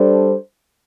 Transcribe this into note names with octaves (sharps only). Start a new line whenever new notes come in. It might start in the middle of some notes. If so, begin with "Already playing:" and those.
Already playing: G3 D4 A4 C5